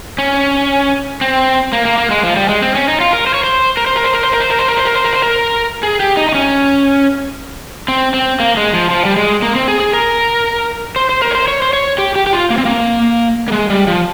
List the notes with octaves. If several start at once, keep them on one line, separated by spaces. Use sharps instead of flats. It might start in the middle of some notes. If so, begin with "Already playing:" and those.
C#4
C4
A#3
A#3
A#3
G#3
F3
G3
G#3
C4
C#4
D#4
F4
A#4
C5
C#5
C5
A#4
C5
A#4
C5
A#4
C5
A#4
C5
A#4
C5
A#4
C5
A#4
C5
A#4
C5
A#4
G#4
G4
D#4
D#4
C#4
C4
C4
A#3
G#3
F3
F3
G3
G#3
A#3
C4
G#4
G#4
A#4
C5
C5
A#4
C#5
C5
C#5
C5
C#5
G4
G4
G4
F4
A#3
C4
A#3
A#3
G#3
G3
F3